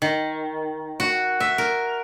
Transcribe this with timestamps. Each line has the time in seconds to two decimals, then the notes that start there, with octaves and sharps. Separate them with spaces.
0.02 D#3
1.00 F#4
1.40 E5
1.58 A#4